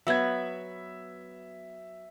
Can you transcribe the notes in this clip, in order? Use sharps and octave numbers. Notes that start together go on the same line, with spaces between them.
F#3 B3 E5 G#6